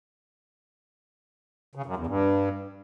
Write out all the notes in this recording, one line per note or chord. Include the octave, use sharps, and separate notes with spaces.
C#3
F#2
E2
G2